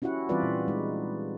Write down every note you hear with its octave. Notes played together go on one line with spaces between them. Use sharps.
C#4 E4 F#4 G4 F#5
E3 G3 C4 F4 B4 D5
A#2
G#3 D#4